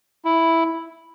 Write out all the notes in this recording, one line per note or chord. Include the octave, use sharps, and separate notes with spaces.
E4